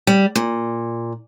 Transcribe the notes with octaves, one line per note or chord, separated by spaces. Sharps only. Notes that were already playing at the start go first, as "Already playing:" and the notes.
G3
A#2